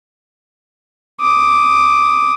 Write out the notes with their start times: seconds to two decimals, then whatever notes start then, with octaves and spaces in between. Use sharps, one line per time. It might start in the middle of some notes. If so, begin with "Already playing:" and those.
1.21 D6 D#6